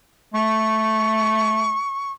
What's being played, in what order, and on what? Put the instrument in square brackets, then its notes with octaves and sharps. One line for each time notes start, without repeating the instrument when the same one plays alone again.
[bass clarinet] A3 [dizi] C#6